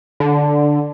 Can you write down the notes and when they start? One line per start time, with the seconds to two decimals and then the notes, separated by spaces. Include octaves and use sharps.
0.20 D3